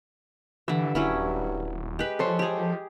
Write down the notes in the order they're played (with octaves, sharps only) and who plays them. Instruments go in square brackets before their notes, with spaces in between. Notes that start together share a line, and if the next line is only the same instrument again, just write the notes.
[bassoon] G2 [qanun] D3 E5 [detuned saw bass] E3
[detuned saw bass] D#1 [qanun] F#3 C#4 E4
[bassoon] G#3 [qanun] G4 B4
[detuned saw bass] F3 [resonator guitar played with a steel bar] A4 C5 C#5
[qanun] G4 G#4